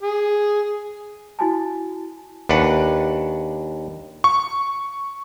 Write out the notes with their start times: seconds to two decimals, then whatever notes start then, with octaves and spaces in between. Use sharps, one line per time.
0.02 G#4
1.39 E4 F#4 G#5 A5
2.49 D#2 D4 B4 F#5
4.24 C#6